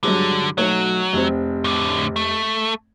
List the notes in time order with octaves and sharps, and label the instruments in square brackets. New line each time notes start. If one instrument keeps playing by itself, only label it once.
[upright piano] G2 F#3 G#3 [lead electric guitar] D3
[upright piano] B1 A3 C#5 [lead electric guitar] F#3
[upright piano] F1 C4
[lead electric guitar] A2 D3
A3